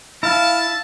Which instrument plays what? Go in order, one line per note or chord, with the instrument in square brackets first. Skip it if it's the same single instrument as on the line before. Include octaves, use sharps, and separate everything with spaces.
[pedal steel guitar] E4 F5 [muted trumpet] A5